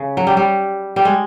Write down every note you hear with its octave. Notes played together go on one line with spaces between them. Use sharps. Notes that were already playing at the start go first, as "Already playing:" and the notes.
Already playing: C#3
F#3
G3
G3
G3
G#3